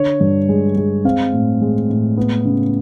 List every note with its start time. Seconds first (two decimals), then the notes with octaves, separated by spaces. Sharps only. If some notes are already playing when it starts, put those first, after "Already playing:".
Already playing: D3 C#5
0.21 G2
0.49 G#3
0.77 G#3
1.05 C4 F5
1.33 A2
1.61 G#3
1.90 A2
2.17 B3
2.45 C#3